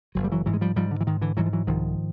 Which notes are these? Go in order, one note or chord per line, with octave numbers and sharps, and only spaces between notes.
F#1 F#3
G3
E3 F#3
G#2 E3 F#3
G#3
F3 G3
G#2 F3 G3
D3
E3
G#2 D#3
D3 E3
G#2 E3 F#3
F3
E3 F#3
C2 D#3 F3